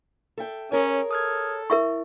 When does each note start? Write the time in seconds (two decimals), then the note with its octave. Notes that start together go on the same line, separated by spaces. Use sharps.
0.38 A4 E5 G5
0.72 C#4 G#4 A#4 C#5
1.11 A4 D#6 F6 G#6
1.70 E4 A#4 E5 C#6